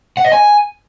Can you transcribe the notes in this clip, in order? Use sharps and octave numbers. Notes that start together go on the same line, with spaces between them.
F#5
D#5
G#5